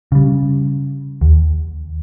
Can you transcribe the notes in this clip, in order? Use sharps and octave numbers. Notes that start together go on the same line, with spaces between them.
C#3 G3
D#2